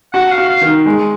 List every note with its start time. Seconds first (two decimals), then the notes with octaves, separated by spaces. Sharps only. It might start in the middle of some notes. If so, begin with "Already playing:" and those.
0.13 F#4 F#5
0.32 F5
0.38 F#4
0.49 F5
0.61 D#3
0.86 G#3